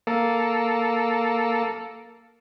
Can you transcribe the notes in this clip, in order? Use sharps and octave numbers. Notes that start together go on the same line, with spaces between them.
A#3 A4